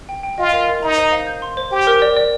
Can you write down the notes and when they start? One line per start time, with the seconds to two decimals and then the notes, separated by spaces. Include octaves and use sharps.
0.09 G5
0.23 G5
0.38 F4 D#5
0.53 A#4
0.69 A#4
0.82 D#4 A#5
0.97 C5
1.12 F5
1.27 G6
1.42 C6
1.57 C5
1.72 G4 G5
1.87 A#4
2.02 D5
2.16 D5